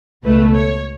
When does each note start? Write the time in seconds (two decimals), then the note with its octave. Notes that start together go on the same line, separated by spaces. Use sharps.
0.23 C#2 B2 A3 B4
0.54 C#5